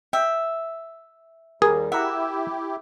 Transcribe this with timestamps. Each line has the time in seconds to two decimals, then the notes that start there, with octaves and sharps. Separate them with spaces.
0.13 E5 G5
1.62 D#2 G3 G#4 A#4
1.92 E4 G4 E5 F#5 A#5